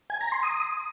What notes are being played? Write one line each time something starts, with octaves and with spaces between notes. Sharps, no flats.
G#5
A#5
C6
D#6